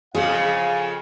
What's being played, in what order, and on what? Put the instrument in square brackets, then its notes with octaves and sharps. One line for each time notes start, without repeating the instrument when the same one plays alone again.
[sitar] F2 C#3 [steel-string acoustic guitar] G#4 [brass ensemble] F5